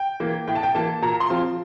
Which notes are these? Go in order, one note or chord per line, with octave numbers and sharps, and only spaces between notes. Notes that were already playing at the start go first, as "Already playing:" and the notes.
Already playing: G5
E3 A#3
A2 G5
A5
G5
E3 A#3 A5
A#2 A#5
C6
F3 C4 F4